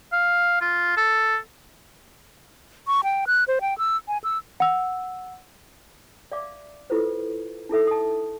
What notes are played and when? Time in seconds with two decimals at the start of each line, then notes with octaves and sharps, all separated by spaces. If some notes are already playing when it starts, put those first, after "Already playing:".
0.13 F5
0.61 F4
0.97 A4
2.87 C#6
3.04 G5
3.27 F#6
3.48 C5
3.61 G5
3.78 E6
4.08 G#5
4.24 E6
4.60 F#5 E6
6.32 D5 E5 F5 D6
6.90 E4 F4 A4 B4 C5
7.69 D#4 E4 A4 E5
7.87 A5 D#6